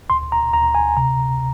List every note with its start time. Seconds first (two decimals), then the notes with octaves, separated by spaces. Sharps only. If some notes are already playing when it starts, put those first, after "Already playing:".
0.10 D2 C6
0.32 A#5
0.54 D2 A#5
0.75 G#5
0.97 C3 A#5